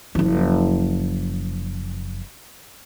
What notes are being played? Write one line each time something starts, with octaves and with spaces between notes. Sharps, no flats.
F#1 F3